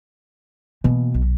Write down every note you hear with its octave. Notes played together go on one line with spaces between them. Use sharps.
B2 E3 A#3
B1